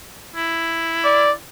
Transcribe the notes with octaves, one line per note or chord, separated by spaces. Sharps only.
E4
D5